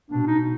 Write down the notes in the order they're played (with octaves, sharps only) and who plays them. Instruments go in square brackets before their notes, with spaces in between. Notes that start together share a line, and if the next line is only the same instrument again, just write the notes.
[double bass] B2 [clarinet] D4
[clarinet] D#4